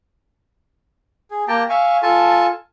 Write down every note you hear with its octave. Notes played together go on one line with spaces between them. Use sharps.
G#4
A#3 G4 G5 A5 A#5
E5 F5 G#5 C#6
F4 A4 G#5 A5